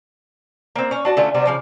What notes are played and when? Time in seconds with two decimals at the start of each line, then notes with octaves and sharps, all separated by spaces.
0.76 A#3 C4
0.91 C#4 C#5
1.05 D4 F#4 A5
1.17 D3 A3 C#4 F4
1.34 C3 G3 B3 D4
1.45 C#3 F3 D5